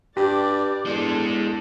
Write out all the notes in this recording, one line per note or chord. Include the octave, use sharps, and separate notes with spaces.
G2 G4 D5
E2 G#3 D4 A4 C5